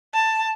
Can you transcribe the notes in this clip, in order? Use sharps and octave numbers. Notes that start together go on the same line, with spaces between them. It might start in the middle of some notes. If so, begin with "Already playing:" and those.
A5